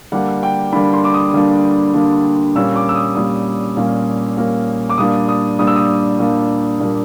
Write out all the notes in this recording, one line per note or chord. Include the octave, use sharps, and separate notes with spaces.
D3 G3 A#3 D4 F#5
G5
D3 G3 A#3 D4 B5
C6
D6
D#6
D3 G3 A#3 D4
D3 G3 A#3 D4
A#2 G3 A#3 C#4 E6
D6
E6
D#6
A#2 G3 A#3 C#4 D#6
A#2 G3 A#3 C#4
A#2 G3 A#3 C#4
D6
A#2 G3 A#3 D4 D#6
D#6
A#2 G3 A#3 D4 D#6
E6
D#6
A#2 G3 A#3 D4
A#2 G3 A#3 D4